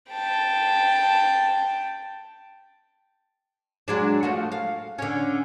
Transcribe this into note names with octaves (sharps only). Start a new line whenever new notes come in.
G5 A5
F#3 G#3 D4
F3 A3 F#4
F5
D3 C#4